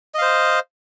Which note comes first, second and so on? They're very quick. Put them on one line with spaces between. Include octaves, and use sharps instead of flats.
D#5 F5 C5